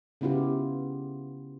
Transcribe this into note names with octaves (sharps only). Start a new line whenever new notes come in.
C#3 B3 E4 F4 G4